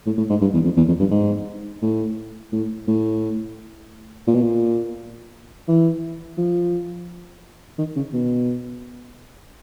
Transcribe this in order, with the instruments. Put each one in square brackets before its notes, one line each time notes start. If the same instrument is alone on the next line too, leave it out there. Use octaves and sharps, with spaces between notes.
[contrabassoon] A2
A2
G#2
G2
E2
F2
E2
F2
G2
G#2
A2
A2
A2
A#2
B2
A#2
E3
F3
D#3
C#3
B2